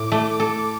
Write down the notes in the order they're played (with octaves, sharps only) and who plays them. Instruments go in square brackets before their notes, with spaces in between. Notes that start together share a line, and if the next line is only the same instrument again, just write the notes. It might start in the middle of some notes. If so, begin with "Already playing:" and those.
Already playing: [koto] A2 [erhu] D6
[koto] A3
A4